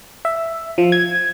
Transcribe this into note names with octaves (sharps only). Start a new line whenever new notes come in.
E5
F3
G#6